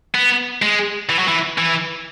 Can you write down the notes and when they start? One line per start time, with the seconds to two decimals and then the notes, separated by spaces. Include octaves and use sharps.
0.15 B3
0.62 G#3
1.10 E3
1.19 F#3
1.28 E3
1.58 E3